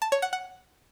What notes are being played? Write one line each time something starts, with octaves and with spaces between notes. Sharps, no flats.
A5
C#5
F#5
F#5